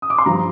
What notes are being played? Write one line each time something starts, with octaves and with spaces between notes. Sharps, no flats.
D#6
D6
C6
G2 F3 A#5